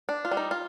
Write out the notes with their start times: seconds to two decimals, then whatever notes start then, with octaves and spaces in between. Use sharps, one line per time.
0.09 D4
0.25 F4
0.31 G3
0.37 D#4
0.51 F4